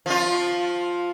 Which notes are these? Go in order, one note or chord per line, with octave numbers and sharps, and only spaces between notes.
F3 F4